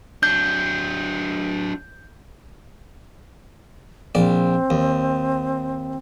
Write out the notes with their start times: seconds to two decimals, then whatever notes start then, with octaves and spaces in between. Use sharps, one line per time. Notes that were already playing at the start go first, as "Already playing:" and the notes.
0.23 F#3 D4 G6
4.15 A#1 C4 D5
4.70 D#2